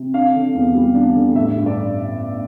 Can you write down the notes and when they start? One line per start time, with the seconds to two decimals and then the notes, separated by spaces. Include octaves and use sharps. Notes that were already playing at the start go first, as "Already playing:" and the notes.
Already playing: C3
0.14 D4 F5
0.35 D3
0.55 E2
0.75 G3
0.95 D4
1.15 D3
1.35 A1 E5
1.56 G2
1.66 D5